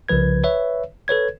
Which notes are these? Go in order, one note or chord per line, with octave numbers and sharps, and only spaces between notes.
C2 C#3 F3 B4 G#6
B4 C#5 E5
A4 B4 C#5 G#6